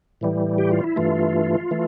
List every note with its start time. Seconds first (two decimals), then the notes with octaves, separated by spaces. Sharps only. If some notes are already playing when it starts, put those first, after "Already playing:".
0.21 A2 E3 G3
0.58 G4
0.71 F4
0.84 E4
0.96 G2 E3 A3 F4
1.71 E3 A3